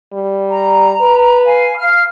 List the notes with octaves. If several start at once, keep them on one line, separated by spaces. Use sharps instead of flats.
G3
A#5
B4
F5 G#5
F5 F6